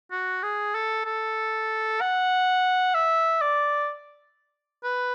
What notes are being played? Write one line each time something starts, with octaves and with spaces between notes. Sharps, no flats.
F#4
G#4
A4
A4
F#5
E5
D5
B4